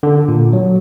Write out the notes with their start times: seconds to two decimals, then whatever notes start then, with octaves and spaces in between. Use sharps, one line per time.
0.03 D3
0.28 A#2
0.53 F#3